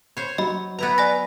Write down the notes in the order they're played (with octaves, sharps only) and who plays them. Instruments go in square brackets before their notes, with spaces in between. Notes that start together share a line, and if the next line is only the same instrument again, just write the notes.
[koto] C5 C#5
[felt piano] F#3 [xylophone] D#5 B5
[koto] B3 E4 A#5 [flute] B4
[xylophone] D5 G#5 A#6